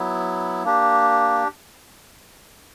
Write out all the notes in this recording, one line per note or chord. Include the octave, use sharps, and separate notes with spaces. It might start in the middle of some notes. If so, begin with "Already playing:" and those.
Already playing: F#3 B3 E4
A#3 D4 G4